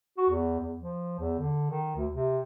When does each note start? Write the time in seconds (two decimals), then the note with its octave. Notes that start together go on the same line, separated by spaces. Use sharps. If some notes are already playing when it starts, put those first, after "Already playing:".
0.18 F#4
0.30 E2
0.60 E2
0.79 F3
1.19 E2
1.39 D3
1.71 D#3
1.96 D2
2.14 C3